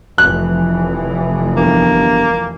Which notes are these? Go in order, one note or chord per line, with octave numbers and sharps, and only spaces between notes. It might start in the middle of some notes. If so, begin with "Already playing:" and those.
F1 E3 F#6
G1 A#3